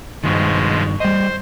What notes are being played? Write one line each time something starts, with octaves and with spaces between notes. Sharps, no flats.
G2 B2 D#3 F3 G#3
G3 C5 D#5